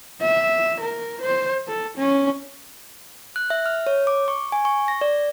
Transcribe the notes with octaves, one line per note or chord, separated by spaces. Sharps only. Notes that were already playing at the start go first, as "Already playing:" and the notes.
E5
A#4
C5
A4
C#4
F#6
E5
F6
C#5
D6
C#6
G#5
C#6
A#6
D5